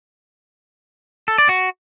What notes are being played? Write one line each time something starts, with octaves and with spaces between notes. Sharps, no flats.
A4
D5
F#4